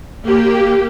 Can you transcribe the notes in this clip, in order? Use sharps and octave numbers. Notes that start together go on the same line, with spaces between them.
A#3 G4